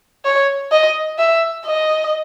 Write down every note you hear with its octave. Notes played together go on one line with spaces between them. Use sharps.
C#5
D#5
E5
D#5